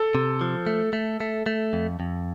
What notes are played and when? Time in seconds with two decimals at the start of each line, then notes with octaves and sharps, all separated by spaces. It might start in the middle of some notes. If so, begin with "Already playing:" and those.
Already playing: A4
0.15 C3
0.41 F3
0.67 A3
0.93 A3
1.20 A3
1.46 A3
1.73 F2
2.00 F2